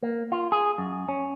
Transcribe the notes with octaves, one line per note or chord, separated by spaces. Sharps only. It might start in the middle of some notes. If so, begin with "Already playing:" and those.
A#3
F4
G#4
F#2
C#4